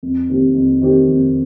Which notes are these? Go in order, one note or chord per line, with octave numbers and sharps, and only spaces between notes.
F2
D#3 C4 G4
F2
D#3 C4 G4
F2